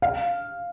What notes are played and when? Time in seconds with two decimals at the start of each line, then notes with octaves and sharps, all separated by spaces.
0.02 F5